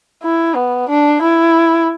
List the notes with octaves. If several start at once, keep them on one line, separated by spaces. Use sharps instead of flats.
E4
B3
D4
E4